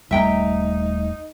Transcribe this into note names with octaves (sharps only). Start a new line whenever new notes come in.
D#1 G3 A3 D#4 E5 G5 A#5